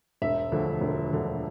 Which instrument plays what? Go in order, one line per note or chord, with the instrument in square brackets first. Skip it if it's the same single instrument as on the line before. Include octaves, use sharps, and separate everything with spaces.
[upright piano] E1 E5
D2 D3 F3
E1
D2 D3 F3